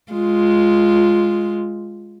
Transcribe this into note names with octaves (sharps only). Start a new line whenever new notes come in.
G#3 F4